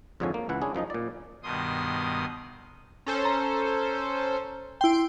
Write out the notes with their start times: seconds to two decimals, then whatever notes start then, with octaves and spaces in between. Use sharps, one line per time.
0.20 F2 G#2 D3 F3 C#5 G#5
0.34 A#3
0.49 C#2 E3 E4 F#5
0.62 C#4 D4 E4 G#4
0.75 F#2 F3 D#4 D#5
0.90 A#2 D5
1.43 G2 B2 D#3 C6 D#6
3.06 C#4 A4 C5
3.25 A#5
4.81 E4 G5 C6 D7